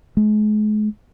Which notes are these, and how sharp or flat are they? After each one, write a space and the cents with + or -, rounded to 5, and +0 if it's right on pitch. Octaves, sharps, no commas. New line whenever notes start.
G#3 +40